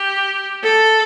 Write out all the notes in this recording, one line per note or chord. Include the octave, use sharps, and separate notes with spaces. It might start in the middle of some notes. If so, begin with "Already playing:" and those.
Already playing: G4
A4